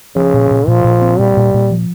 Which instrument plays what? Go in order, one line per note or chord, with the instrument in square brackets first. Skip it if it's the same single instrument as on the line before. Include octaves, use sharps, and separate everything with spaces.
[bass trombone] C#3 [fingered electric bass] F3
[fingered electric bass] A#2
A#2
[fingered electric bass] A#2 [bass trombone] F3
[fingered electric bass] A#2
C4
[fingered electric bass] A#2 [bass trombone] G3
[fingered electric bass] A#2
A#2
F3